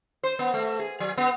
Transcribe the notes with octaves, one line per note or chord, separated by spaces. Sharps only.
C5
B3
A3
G#4
F#3
B3